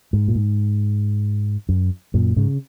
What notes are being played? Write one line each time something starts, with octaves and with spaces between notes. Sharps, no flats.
G#2
A#2
G#2
F#2
F#2 A#2
G#2 C#3